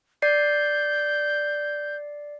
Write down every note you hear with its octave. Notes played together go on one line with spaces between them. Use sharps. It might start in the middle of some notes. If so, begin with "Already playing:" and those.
D5 G6 C7